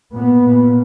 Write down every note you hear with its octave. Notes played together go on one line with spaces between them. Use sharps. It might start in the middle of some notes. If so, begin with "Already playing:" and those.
A#2 B3
A#2